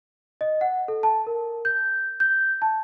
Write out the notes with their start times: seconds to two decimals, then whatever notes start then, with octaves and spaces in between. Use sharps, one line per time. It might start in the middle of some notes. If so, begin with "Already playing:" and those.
0.41 D#5
0.61 F#5
0.88 A4
1.03 A5
1.27 A#4
1.65 G6
2.20 G6
2.62 A5